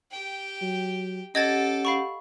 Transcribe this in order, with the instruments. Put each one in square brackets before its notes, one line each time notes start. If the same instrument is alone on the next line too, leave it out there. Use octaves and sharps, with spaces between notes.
[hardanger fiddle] G4 G5
[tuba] F#3
[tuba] C#4 [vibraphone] G4 F#5 [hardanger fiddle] A4 D6 [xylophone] D#5 G#6 A6
[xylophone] F5 B5 C#6